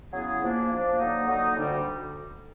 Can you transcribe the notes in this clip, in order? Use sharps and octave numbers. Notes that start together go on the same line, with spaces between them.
C#3 F#3 B3 E4 G#4
F3 A#3 D4
F3 A#3 D4
D3 F#3 A#3 D#4
D3 F#3 A#3 D#4
D2 D3 G3